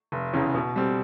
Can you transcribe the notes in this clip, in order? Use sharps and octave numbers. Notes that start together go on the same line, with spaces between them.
F1
E2 C#3
B2
G3 C4